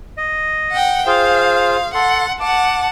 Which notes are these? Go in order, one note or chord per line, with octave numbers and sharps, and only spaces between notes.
D#5
F#5 G5
F4 G#4 C5 F5
A4 F#5 C6
F#5 A5 D6